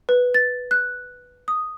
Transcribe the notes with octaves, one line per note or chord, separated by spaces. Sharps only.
B4
A6
F#6
D#6